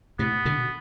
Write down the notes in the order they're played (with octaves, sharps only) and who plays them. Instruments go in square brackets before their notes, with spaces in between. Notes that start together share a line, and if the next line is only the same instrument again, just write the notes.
[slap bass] A2 C3 [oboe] B3
[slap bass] B2 D3